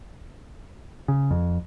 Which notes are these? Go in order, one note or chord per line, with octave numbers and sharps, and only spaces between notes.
C#3
F2